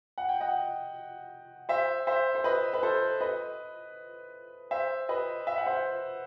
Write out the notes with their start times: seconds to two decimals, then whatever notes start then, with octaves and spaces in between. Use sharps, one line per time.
0.18 F#5
0.29 G5
0.40 D#5 F#5
1.69 C5 E5
2.07 C5 E5
2.35 C5
2.44 B4 D#5
2.73 B4
2.83 A4 C5
3.21 B4 D#5
4.71 C5 E5
5.09 B4 D#5
5.47 E5
5.57 F#5
5.66 C5 E5